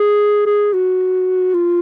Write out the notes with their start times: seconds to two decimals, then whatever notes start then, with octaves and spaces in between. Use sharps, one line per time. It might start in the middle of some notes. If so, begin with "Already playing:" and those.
Already playing: G#4
0.46 G#4
0.73 F#4
1.54 F4